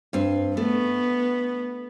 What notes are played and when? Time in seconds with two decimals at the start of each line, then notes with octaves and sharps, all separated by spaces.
0.13 G2 C4
0.57 A3 B3